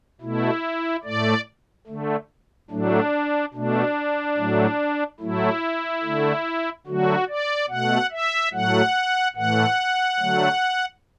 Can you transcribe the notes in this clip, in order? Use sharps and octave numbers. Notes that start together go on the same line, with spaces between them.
B2 A3 E4
A2 A3 D5
D3 A3
A2 F#3 A3 D4
B2 A3 D4
A2 F#3 A3
A2 F#3 A3 E4
D3 A3
D3 F#3 A3 F#4
D5
B2 A3 F#5
E5
A2 F#3 A3 F#5
A2 E3 A3 F#5
D3 F#3 A3